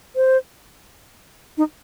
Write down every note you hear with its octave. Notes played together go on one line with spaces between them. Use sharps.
C5
D#4